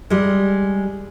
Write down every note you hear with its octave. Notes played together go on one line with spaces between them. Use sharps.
G3 G#3